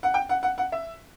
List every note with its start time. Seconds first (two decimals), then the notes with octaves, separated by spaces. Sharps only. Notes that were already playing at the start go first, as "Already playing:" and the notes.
0.03 F#5
0.14 G5
0.29 F#5
0.43 F#5
0.58 F#5
0.72 E5